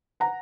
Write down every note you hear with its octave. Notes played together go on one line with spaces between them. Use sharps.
F#5 A#5